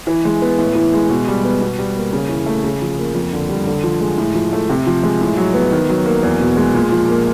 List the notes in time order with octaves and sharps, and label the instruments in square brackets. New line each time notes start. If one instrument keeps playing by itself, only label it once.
[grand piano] E3
G#3
B3
A2
E3
G#3
B2
G3
B3
B2
G3
A#3
C#3
E3
A3
C#3
F3
A#3
F2
D3
G3
D3
F3
G#3
A2
F3
A3
C3
F3
G#3
A2
F#3
B3
D#3
F#3
A#3
E2
B2
G#3
A#2
F3
A#3